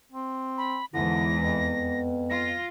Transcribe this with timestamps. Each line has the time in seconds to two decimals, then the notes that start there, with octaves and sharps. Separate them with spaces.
0.12 C4
0.58 B5
0.94 E2 G#2 D3 E4 A#6
1.40 F2 B3
2.30 F4 A#6